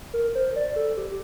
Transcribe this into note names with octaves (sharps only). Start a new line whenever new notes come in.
A#4
C5
D5
A4
G4